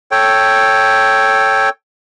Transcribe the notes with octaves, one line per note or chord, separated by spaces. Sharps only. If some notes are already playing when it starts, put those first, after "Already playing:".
A4 C#5 G5